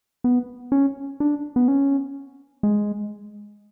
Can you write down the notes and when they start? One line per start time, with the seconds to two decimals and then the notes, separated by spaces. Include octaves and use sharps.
0.24 B3
0.72 C#4
1.20 D4
1.56 B3
1.68 C#4
2.63 G#3